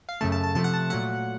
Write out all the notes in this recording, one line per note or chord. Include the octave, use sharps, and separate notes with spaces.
F5
F#2 C#3 A3 A5
A5
A5
C3 F3 A3 A5
F#5
A5
A#2 F#3 A3 F#5